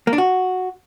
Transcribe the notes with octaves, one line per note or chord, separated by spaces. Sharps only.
A#3
D4
F#4